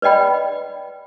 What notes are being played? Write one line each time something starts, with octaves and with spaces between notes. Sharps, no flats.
B4 D5 D#5 G5 B5